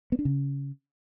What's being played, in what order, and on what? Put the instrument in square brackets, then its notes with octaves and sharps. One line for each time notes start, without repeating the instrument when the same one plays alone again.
[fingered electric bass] B3
D4
C#3